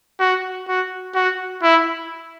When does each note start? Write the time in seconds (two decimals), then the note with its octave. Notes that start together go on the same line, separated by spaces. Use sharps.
0.20 F#4
0.68 F#4
1.15 F#4
1.62 E4